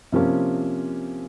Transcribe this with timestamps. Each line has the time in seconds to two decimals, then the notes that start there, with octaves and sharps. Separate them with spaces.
0.12 C3 F3 A#3 C#4